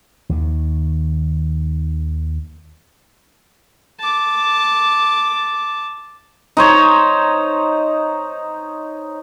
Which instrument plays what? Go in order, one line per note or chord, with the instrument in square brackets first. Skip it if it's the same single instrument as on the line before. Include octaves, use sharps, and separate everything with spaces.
[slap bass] D#2 D#3
[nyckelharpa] A5 D6
[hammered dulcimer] D#4 C5 C#5